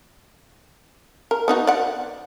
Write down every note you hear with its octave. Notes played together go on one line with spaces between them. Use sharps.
A#4
B3 D#4 F#4
D5 F#5